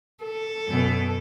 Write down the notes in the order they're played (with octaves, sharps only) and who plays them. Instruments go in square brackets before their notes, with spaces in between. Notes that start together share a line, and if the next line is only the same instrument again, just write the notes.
[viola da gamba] A4
[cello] F#2 B2